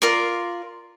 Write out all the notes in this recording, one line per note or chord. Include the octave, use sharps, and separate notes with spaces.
F4 A#4 D5 C6